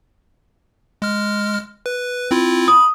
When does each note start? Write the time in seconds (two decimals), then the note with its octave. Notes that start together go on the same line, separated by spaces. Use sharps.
1.02 G#3 F6
1.86 B4
2.31 C4 E4 F4
2.68 B5 D#6